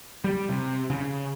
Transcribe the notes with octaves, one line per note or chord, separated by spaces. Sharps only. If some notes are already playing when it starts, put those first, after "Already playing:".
G3
C3
C#3